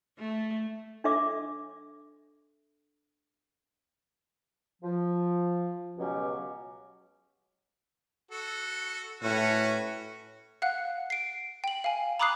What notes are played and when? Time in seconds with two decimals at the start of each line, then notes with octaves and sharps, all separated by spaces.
0.19 A3
1.04 D4 A4 E5 D6
4.82 F3
5.97 C#2 B2 F#3 C#4 G4
8.31 F#4 A4
9.23 A2 C#4 F#4 B4
10.62 F5 F#5 F#6
11.10 C7 D7
11.64 G5 F#7
11.84 F5 G#5
12.19 A#5 B5 D6 D#6 F#6 C7